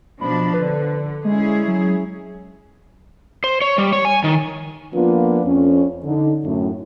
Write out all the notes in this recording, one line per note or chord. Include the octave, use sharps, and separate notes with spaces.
B2 F3 D4 B5
D3 B4
G#3 C#4 E4 G#4
F#3
C5
C#5
G3
C#5
G#5
D#3
F3 A#3 B3 D4 F4 B4
F2 C#4
D3 D#4
F#2 A2